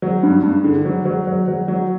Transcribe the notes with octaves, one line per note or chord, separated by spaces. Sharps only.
F#3
G2
G2
D3
F#3
F#3
F#3
F#3
F#3